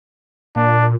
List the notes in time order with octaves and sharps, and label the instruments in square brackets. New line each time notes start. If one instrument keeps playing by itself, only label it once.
[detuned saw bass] A#2 [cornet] D4